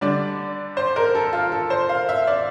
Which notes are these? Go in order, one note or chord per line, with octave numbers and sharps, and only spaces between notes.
D3 G3 D4 D5
C5
A#4
A4
F4
A4
C5
F5
E5
D5